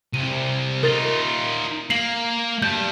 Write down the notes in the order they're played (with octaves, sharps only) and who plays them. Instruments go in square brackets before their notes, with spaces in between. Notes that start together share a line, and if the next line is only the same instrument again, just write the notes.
[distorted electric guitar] C2 [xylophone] D#7
[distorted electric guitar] D#4 F4 [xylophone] A#4 A6
[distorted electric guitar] A#3 [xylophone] C7 F#7
[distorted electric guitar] G3 A5 [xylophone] G6